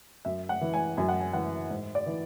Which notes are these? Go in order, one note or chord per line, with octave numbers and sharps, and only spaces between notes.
F#2 E5
F#5
E3
G#5
F#2 G#5
F#5
G#5
E3 F#5
G#2
D5
E3